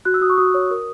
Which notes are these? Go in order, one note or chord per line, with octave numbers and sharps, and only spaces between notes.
F#4 F#6
E6
F#4 D#6
C#6
F#4 D#6
C#5
A#4